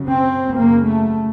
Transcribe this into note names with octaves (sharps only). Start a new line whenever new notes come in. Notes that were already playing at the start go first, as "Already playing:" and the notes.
Already playing: F#2 C#3
C4
F#2 C#3 A#3
A3